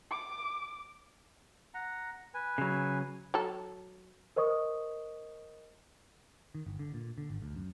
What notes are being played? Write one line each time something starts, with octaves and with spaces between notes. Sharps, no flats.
D6
F#5 A#5
B4 G#5
C#3 F#3
F#3 A4
A#4 C5 D#5 C#6 D#6
D#3
G1
D3
A#2
D3
G#1
D2
F#2